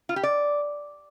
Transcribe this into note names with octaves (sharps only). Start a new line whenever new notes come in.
F4
G4
D5